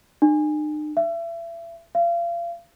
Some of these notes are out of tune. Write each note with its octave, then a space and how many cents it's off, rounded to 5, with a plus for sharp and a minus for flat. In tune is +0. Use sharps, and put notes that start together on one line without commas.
D#4 -45
E5 +35
F5 -35